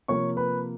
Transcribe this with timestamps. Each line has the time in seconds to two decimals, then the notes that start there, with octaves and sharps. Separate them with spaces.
0.08 C3 F3 A#3 C#5 C#6
0.37 B4 B5